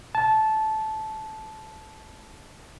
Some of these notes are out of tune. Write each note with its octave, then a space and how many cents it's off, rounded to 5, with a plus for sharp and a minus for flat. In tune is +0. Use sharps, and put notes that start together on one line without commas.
A5 -15